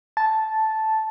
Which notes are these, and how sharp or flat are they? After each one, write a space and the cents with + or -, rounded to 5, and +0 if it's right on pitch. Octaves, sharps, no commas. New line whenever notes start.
A5 -5